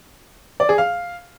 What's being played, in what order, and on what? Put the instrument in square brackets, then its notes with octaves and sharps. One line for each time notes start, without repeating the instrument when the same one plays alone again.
[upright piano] D5
G#4
F5